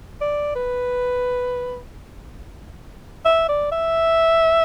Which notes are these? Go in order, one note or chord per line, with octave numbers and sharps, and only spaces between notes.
D5
B4
E5
D5
E5